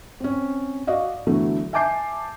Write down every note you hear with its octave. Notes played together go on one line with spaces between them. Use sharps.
C4 C#4
F#4 D5 D#5 F5
D3 E3 F#3 A3 B3
E5 G#5 A5 D6 G6 C7